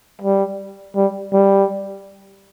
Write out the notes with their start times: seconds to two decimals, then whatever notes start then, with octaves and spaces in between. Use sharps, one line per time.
0.22 G3
0.96 G3
1.33 G3